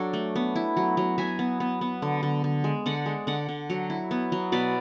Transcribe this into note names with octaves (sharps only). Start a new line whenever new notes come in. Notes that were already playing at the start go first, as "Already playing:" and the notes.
Already playing: F#3 D4 A4 C#5
A3
B3
E4
F#3
F#3
F#3 E5 G#5
B3
B3
B3
D3
D3
D3
G#3
D3 D5 F#5
G#3
D3 D5 F#5
D3
F#3
E4
B3
F#3
B2 B4 D5